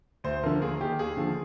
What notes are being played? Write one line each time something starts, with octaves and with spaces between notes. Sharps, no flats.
D2 C5
D3 F3 A#4
D#2 G#4
D#3 G4
D#2 G#4
D3 F3